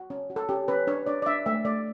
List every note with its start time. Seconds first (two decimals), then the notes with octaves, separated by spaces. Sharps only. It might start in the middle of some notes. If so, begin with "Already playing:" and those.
Already playing: F#4
0.10 C#4
0.30 F#4
0.36 A4
0.49 C#4 G4
0.68 C#4 B4
0.87 D4 C#5
1.07 D4 D5
1.22 D5
1.26 D4 E5
1.46 A3 E5
1.65 A3 D5